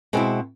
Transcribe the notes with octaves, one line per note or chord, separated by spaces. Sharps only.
B2 G#3 C4 E4